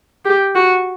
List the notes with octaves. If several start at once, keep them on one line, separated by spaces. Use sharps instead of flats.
G4
F#4